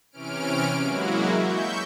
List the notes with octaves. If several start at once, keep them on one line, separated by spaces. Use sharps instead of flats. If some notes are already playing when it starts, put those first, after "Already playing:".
C3 E3 C#4 F6 D7
F#3 G#3 A#3 E4 F#4
E5 C#6 G6